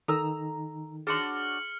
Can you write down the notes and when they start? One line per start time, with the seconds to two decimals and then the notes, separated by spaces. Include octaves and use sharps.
0.08 D#3 D#4 A4 A#5 E6
1.07 D4 F#4 G#4 C#5 C6 F6 C#7 F#7